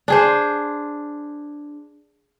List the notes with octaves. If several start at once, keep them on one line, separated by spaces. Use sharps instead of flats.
D4 G#4 C5